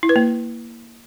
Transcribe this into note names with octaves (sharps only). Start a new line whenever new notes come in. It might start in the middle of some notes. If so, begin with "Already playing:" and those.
E4
B4
A#3